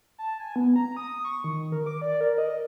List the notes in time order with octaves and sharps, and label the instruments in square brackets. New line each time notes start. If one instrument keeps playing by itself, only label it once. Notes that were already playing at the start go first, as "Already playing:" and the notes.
[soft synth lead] A5
G#5
B3
A#5
D#6
C#6
D#3
A#4
D6
D5
A#4
D#5